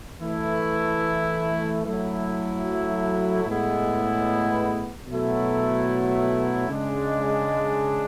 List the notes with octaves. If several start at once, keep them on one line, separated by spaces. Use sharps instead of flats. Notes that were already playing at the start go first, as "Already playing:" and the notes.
E3 A3 E4
F#3 A3 E4
A2 G#3 B3 E4
B2 F#3 A3 E4
C#3 G#3 D4